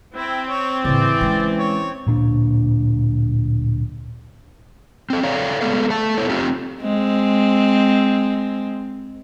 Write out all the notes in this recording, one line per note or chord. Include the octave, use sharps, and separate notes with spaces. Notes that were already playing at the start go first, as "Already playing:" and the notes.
C4 E4
C#5
A2 C#3 E3 D5
G#3 C#4
C#5
D1 A#2 C#4 D4
C4 A4
A4 C#5 D5 F5 G5 A#5
G#3 A3 B3 A4 F5
A3 A4 A5
B3 E4 A4 C5 C#5
C4 D#4 F4 G4
G#3 C4